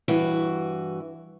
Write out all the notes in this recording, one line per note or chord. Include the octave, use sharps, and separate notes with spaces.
G2 E3 F#4